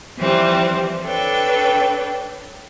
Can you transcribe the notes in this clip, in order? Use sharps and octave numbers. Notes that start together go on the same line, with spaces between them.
E3 F3 G3 C4 G4
D4 A4 B4 C#5 G5